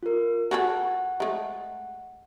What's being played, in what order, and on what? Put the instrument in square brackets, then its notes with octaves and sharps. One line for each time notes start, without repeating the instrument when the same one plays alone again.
[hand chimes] F4 A#4
[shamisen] F#4 G#4 A4 [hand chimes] F#5
[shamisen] G#3 A3